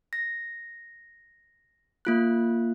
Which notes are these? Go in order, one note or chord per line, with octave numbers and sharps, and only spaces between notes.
A#6
A#3 F4 F#6